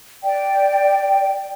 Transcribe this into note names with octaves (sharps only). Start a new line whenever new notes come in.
D5 G5